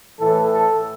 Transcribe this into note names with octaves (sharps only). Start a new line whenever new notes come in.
A2 E3 A4
A4